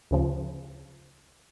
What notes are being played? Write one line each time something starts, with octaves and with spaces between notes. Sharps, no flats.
D2 C#3 F3